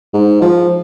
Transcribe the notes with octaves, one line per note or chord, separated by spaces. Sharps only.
G#2
F3